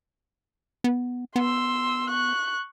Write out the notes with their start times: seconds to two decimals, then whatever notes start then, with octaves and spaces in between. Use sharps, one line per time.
0.84 B3
1.36 B3 C6 E6
2.10 C#6 F#6